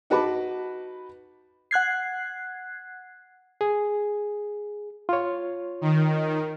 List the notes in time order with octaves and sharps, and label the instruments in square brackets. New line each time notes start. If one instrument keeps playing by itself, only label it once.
[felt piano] D#4 F#4 B4 A5 B5 D6
[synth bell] F#5 F#6 G#6 C7
[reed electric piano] G#4
F4 C#5
[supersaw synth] D#3